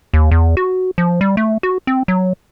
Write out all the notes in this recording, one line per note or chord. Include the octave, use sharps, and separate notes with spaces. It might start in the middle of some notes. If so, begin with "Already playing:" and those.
D#2
E2
F#4
F3
G3
A3
F#4
C4
F#3